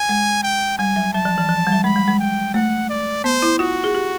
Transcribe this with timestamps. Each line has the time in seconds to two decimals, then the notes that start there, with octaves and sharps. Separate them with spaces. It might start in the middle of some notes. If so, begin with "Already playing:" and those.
Already playing: G#5
0.09 G#3
0.43 G5
0.78 G3 G#5
0.96 F#3
1.13 F#3 A5
1.25 F3
1.38 E3
1.49 F3
1.67 G3
1.72 F#3
1.84 G#3 B5
1.96 G3
2.07 G#3
2.19 G5
2.54 A3 F#5
2.89 D5
3.24 B3 C5
3.42 E4
3.59 F4 F#4
3.84 G#4
3.95 G4